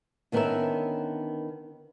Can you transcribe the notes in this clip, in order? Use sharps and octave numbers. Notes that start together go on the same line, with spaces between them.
D3 D#3 B3 C#4 A#4 E5